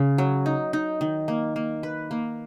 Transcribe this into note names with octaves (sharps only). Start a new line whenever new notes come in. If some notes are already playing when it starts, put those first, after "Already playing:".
Already playing: C#3
F#3
D#4
D#4
D#3
A#3
A#3
B4
A#3